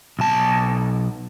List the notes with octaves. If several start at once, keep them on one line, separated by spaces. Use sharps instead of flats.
B1 A5